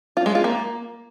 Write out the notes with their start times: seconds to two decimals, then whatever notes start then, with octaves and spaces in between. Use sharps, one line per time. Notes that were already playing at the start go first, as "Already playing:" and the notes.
0.17 F4
0.26 G#3
0.35 F4
0.44 A#3